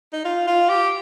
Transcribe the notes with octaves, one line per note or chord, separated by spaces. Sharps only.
D#4
F4
F4
G4